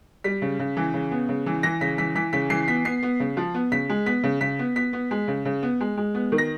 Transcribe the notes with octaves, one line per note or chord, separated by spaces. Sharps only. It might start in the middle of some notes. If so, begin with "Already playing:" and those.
G3 B6
C#3
C#3
E3
C#3
B3
C#3
E3
E3 A#6
C#3 B6
E3 B6
E3 B6
C#3 B6
E3 C7
B3 B6
B3 C7
B3
C#3
F3
B3
C#3 B6
G#3
B3 B6
C#3
C#3 B6
B3
B3 B6
B3
G#3
C#3
C#3
B3
G#3
G#3
B3
D#3
A#6